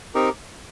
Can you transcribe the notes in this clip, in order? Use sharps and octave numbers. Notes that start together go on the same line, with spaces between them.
C4 D#4 G4 A#4